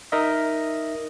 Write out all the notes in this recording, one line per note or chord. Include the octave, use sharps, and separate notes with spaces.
D#4 A#4 D#5 E5